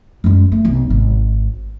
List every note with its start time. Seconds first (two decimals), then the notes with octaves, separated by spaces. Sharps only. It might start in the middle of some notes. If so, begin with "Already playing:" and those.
0.24 F#2 G#3
0.52 A3
0.65 B1 C3
0.90 G#1